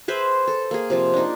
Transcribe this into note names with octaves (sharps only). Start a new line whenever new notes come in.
G#4 B4 C5 E5
A4
A#3 G#4
C3 F3 F4
D4 D#4